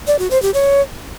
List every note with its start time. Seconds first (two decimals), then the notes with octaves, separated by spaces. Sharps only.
0.07 D5
0.19 F#4
0.31 C5
0.42 G4
0.54 C#5